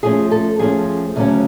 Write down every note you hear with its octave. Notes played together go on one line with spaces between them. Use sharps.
F2 F3 A3 C#4 G#4
A4
F2 F3 A3 C#4 G#4
D2 C#3 F#3 C#4